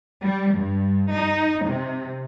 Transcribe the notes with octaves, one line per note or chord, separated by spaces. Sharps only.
G3
G2
D#4
C3